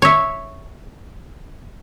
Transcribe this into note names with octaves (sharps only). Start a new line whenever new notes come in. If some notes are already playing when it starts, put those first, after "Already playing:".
C#5 E5